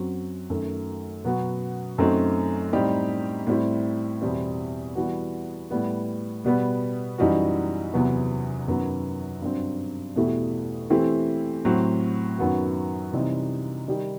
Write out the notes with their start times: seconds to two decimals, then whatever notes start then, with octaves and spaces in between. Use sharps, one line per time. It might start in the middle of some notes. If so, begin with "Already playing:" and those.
Already playing: F#2 F#3 C4 F#4
0.50 F#2 D#3 A3
1.25 B2 F#3 B3 F#4
1.98 F#2 F#3 A3 C4 D#4
2.73 A2 G3 C4 D#4 G4
3.47 A2 G3 C4 E4
4.22 E2 B2 G3 C4
4.95 E3 G3 B3 F#4
5.70 A2 G3 B3
6.45 B2 G3 B3
7.18 F#2 E3 G3 D#4 F#4
7.93 E2 C3 F#3 B3
8.68 F#2 D#3 F#3 B3
9.42 G2 F#3 C4
10.16 E2 B2 A3 E4 G4
10.90 E3 A3 C4 E4 G4
11.65 A2 F#3 C4
12.38 F#2 D#3 F#3 B3 F#4
13.13 C3 E3 G3 C4 D#4
13.88 D#3 G3 D#4 G4